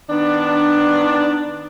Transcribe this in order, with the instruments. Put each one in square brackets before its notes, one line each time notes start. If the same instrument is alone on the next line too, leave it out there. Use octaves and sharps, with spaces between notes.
[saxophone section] D#3 B3 D4